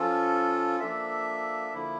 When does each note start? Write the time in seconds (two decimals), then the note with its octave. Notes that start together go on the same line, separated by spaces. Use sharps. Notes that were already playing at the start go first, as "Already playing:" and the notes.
Already playing: F3 C#4 F4 A4
0.80 F3 A#3 D4 A4 E5
1.73 D3 F3 A#3 E4